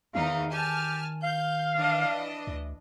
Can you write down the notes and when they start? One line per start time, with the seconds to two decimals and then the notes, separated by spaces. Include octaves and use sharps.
0.15 E2 D#3 D#4 F5
0.53 G4 G#5 A5 F6
1.24 F5 G6
1.76 E3 D4 D#5
2.47 D2